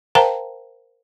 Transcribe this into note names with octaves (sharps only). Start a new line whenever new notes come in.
A#4 C5 F5 G5 A5 A#5